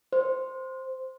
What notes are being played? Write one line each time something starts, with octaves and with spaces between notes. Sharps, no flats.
C5